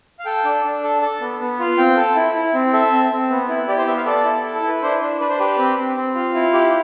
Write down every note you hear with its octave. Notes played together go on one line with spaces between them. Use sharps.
F5
A4 G5
D4
D4
A4
A4 A5
B3
B3
F4
C4 G5
A4
E4
E4
C4
A4 E5
C4
C4
B3
E4
G4 D5
C5
B3 E5
F5
A4 D5
E4
A4
A4
E4
B4
D4 C5
D4
D4 B4
C5
G4 B4
C4
C4
C4
F4
E4
G4